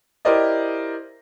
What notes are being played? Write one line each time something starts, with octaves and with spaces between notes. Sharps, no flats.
E4 G4 A#4 C5 D5 D#5